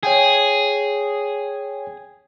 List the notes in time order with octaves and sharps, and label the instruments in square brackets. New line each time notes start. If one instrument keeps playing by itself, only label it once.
[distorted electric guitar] G#4 [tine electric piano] C#5 G5 G#5